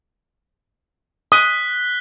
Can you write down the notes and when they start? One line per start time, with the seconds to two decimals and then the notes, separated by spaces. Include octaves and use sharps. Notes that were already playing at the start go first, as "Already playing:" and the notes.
1.32 D#6 F#6 B6 G7